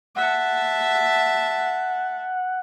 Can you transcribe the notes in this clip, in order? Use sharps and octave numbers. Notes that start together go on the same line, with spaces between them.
E5 F#5 A5